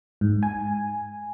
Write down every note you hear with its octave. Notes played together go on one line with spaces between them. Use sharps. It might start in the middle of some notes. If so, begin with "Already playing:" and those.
G#2
G#5